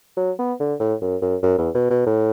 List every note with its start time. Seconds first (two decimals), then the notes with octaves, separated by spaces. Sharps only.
0.17 F#3
0.39 B3
0.60 D3
0.80 A2
1.01 F#2
1.22 F#2
1.43 F#2
1.59 E2
1.75 B2
1.90 B2
2.07 A2